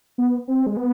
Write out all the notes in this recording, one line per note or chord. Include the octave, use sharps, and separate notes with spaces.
B3
C4
G#3
B3